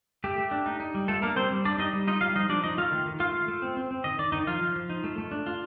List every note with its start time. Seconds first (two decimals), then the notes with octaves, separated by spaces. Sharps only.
0.24 A3 G4
0.38 A3
0.51 D4
0.66 D#4
0.80 D#4
0.95 G3
1.08 A3 F4 A4
1.22 A#3 D4 A#4
1.36 G3 C4 C5
1.51 G3
1.65 A#3 D4 D5
1.78 G3 D#4 D#5
1.93 G3
2.07 D#4 F4 D#5
2.21 G3 F4 F5
2.35 F3 D#4 D#5
2.49 F3 D4 D5
2.64 F3 D#4 D#5
2.78 A3 F4 F5
2.92 D#3
3.06 D#3
3.20 A3 F4 F5
3.35 A3
3.48 A3
3.62 C4
3.77 C4
3.91 C4
4.04 D#3 D#5
4.19 D#3 D5
4.32 D#3 D#4 D#5
4.47 F3 F4 F5
4.61 F3
4.76 F3
4.90 D#4
5.04 A3
5.18 A3
5.31 D4
5.46 F4